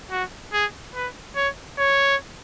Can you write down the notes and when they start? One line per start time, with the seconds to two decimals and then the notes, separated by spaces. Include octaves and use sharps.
0.11 F#4
0.53 G#4
0.95 B4
1.36 C#5
1.78 C#5